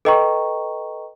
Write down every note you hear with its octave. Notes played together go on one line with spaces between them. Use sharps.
A4 B4 D#5 G5 A#5 C#6